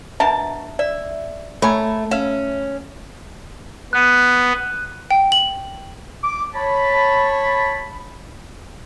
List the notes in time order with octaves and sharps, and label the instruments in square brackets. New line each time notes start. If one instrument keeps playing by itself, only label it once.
[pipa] B2 A#4 A5 [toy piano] D4 E5
[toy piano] D5 [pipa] E5
[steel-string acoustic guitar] A3 [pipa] A#4 C#5 G#5 [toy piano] B5
[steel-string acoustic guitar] C#4 [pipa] E5 F5
[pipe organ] B3 [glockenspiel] F#6 D#7
[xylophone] G5
F#7
[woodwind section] D6
C#5 A5 B5